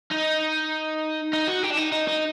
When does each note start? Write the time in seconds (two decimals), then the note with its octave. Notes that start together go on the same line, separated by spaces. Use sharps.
0.12 D#4
1.33 D#4
1.47 F#4
1.63 G4
1.70 D4
1.77 D#4
1.92 D#4
2.08 D#4